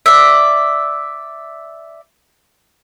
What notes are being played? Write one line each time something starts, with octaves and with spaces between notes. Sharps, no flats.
D5 E5